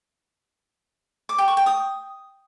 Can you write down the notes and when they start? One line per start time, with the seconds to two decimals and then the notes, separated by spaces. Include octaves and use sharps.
1.29 D6
1.38 G5
1.48 C#6
1.57 G5
1.66 D#6